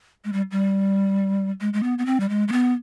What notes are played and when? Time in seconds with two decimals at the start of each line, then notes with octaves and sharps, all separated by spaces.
0.25 G#3
0.33 G3
0.51 G3
1.61 G#3
1.73 G#3
1.83 B3
1.98 B3
2.06 C4
2.20 G3
2.29 G#3
2.48 G#3
2.52 B3